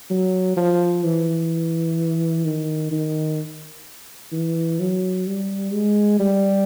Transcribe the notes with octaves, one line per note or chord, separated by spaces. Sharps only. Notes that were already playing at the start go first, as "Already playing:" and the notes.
F#3
F3
E3
D#3
D#3
E3
F#3
G3
G#3
G3